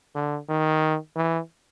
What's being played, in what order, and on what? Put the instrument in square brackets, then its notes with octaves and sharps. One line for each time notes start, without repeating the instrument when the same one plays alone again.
[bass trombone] D3
D#3
E3